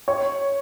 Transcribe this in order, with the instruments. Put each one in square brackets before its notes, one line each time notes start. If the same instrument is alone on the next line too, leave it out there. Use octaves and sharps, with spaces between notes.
[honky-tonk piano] C#5